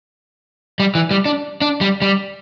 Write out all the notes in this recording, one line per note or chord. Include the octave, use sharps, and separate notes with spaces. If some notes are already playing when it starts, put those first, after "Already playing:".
G3
E3
G3
D4
D4
G3
G3